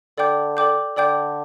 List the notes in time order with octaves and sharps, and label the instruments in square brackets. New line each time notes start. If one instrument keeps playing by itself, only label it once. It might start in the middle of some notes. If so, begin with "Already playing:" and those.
[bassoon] D3 [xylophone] A4 D5 G5 D6 G6
[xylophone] A4 D5 G5 D6 G6
[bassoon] D3 [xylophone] A4 D5 G5 D6 G6